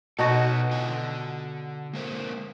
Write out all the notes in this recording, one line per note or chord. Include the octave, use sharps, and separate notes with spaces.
B2 D#4 F#4 A4 B4 C#5
D3 F4 G#5
D3
G#3 A#3 C5